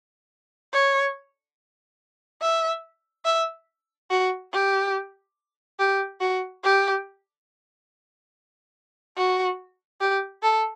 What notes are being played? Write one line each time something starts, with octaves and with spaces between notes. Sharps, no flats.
C#5
E5
E5
F#4
G4
G4
F#4
G4
F#4
G4
A4